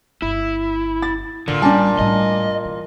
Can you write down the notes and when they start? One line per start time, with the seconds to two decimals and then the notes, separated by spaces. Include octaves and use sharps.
0.22 G1 E4
1.02 A6
1.48 A1 A#2 D3
1.62 G3 D4 G#5 A5
1.99 A2 G3 D#5
2.65 E3